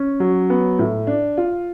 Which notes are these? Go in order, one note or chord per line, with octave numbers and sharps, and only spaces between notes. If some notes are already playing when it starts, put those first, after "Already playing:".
Already playing: C#4
F#3
B3
A2
D4
F4